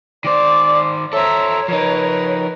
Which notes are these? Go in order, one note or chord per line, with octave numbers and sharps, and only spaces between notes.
D#3 C5 D5 D6
A4 C5 C#5 E5 A#5
F3 D#4 A#4 B4